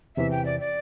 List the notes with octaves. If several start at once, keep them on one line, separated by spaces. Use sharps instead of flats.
E2 C3 E3 E5
G5
D5
D5